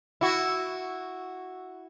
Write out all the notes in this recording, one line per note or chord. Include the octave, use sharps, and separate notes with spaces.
E4 F#4